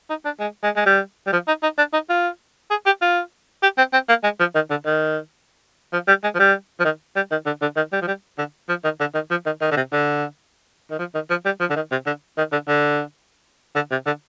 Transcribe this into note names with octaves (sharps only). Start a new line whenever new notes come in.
D#4
D4
G#3
G#3
G#3
G3
G3
F3
D#4
D#4
D4
D#4
F4
G#4
G4
F4
G4
C4
C4
A#3
G#3
F3
D#3
D3
D#3
F3
G3
G#3
F3
G3
F3
D#3
G3
D#3
D3
D3
D#3
G3
F3
G3
D3
F3
D#3
D3
D#3
F3
D#3
D#3
D3
C3
D3
D#3
F3
D#3
F3
G3
F3
D3
D#3
C3
D3
D#3
D3
D3
D3
C3
D3